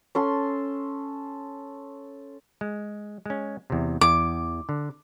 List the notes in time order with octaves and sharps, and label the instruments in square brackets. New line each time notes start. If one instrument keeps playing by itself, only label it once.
[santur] C#4 A4 C6
[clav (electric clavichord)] G#3
G#3 C#4
E2 C3
[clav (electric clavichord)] E2 [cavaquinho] D6
[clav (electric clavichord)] D3